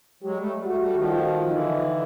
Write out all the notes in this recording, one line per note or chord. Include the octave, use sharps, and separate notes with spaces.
F#3 G#3 G4
G3 A3
G3 A3 F#4
G3 A3
D#3 F3
F4
F3
D3 E3 D#4